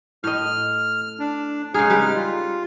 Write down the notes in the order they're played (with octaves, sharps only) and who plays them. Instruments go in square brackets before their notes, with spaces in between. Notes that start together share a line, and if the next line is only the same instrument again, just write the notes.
[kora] A2 D#5 [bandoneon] F6
[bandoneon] D4
[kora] C#3 G#4 [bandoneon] G#3 D#4 F6
[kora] G3 B4
[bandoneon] F4